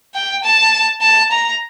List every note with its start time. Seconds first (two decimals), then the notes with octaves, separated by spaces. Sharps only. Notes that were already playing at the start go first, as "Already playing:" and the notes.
0.14 G5
0.44 A5
1.01 A5
1.31 A#5